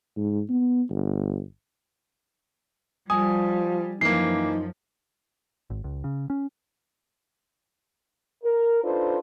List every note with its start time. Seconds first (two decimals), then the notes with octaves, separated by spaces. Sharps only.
0.17 G#2
0.50 B3
0.90 G1
3.10 F3 G3 G#5 D#6
4.01 F#2 E3 F3 A#3 D#4 C7
5.70 G#1
5.84 C#2
6.04 C#3
6.30 C#4
8.44 A#4
8.84 D4 D#4 F4 A4 B4 C5